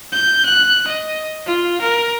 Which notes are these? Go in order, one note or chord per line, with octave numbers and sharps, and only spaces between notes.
G6
F#6
D#5
F4
A#4